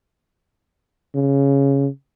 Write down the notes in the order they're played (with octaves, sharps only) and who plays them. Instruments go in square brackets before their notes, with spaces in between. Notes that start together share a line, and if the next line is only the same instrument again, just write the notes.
[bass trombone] C#3